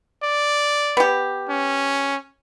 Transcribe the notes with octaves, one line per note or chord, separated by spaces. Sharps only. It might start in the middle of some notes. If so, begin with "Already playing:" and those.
D5
B3 G4
C#4